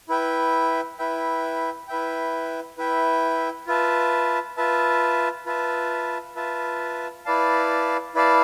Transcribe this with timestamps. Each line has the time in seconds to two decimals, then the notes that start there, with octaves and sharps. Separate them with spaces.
0.09 E4 B4 E5 G5
0.99 E4 B4 E5 G5
1.88 E4 B4 E5 G5
2.78 E4 B4 E5 G5
3.67 F4 B4 E5 A5
4.57 F4 B4 E5 A5
5.46 F4 B4 E5 A5
6.36 F4 B4 E5 A5
7.25 E4 B4 D5 F5 A5
8.15 E4 B4 D5 F5 A5